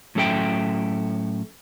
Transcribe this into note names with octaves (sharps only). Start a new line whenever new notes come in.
A2 F#3 C#4 A4 E5 G5